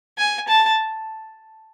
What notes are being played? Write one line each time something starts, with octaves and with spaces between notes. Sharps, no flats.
G#5
A5